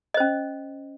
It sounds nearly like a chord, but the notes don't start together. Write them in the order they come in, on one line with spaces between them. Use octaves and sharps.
D#5 C5 C#4